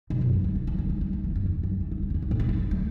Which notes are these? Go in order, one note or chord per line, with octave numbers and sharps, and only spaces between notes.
B2
F#2
A3
F#3
F#3
E3
C#3
E3
F#3
A3
E3
F#2
E2
F#2
E3
F#3
F#3
C#3
E3
F#2
A2
C#3
E3
F#3
A3